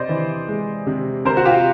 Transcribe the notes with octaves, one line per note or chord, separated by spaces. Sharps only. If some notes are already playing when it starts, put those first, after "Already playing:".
Already playing: C3 C5 D5 D#5
E3
G#3
C3
C3 A#4 C5
F#4
F4 G4